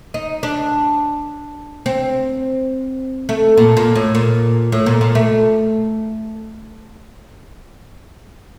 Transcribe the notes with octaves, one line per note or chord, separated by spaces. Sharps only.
D#4
D4
C4
A3
A#2
A#2
A2
A#2
A2
A#2
A#2
A3